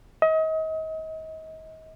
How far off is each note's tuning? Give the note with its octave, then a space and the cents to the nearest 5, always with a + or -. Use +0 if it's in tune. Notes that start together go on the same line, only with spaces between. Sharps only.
D#5 +35